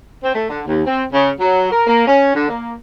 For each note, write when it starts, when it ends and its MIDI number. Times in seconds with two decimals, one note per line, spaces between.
0.23 0.31 60
0.35 0.48 57
0.49 0.61 50
0.66 0.82 39
0.86 1.02 60
1.13 1.29 49
1.39 1.69 54
1.71 1.82 70
1.87 2.05 58
2.07 2.30 61
2.35 2.48 50
2.49 2.74 58